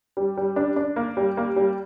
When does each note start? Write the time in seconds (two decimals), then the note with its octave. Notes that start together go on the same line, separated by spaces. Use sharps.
0.17 G3
0.37 G3
0.56 D4
0.76 D4
0.96 A#3
1.17 G3
1.37 A#3
1.56 G3